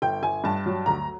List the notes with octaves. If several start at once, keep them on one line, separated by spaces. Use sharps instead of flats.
G1 G5
G1 G#5
G2 A5
F#3
D2 A#5